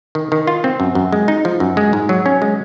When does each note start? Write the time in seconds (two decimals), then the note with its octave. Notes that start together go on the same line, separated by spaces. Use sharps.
0.15 D#3
0.32 D#3
0.47 F4
0.64 C4
0.80 F#2
0.95 F#2
1.12 G#3
1.28 D#4
1.45 F3
1.60 F#2
1.77 G#3
1.93 G#2
2.09 F#3
2.26 C#4
2.42 G#3